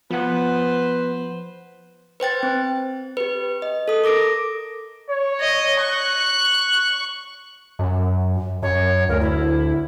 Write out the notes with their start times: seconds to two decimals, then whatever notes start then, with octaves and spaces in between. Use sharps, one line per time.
0.11 F3 B3 B4 C5 F#5
2.20 B4 C5 G5 A6
2.43 C4
3.17 G4 B4
3.62 D#5
3.88 A4 D#6
4.04 A#4 D6 A#6 D7
5.10 C#5
5.40 D#5
5.80 C#6 F#6
7.79 F#2
8.63 F#2 C#5
9.09 D2 A#4
9.21 E4